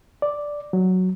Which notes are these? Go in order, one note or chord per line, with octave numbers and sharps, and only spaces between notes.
D5
F#3